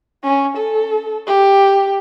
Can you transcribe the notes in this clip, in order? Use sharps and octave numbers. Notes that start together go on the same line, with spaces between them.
C#4
A4
G4